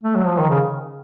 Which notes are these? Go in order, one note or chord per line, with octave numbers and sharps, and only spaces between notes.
A3
F#3
F3
D#3
C#3